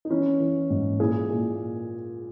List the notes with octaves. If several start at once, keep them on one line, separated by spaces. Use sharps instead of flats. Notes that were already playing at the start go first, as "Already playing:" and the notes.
D#4
E3 C#4 E4
E3
G#2
A#2 E4 G#4
A#2